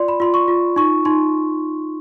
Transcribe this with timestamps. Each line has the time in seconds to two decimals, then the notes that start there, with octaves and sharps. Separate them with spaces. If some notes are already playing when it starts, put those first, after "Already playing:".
Already playing: F4 D5 C6
0.08 B5
0.20 F4 C6
0.34 C#6
0.48 F4
0.76 D#4 C#6
1.05 D#4 C6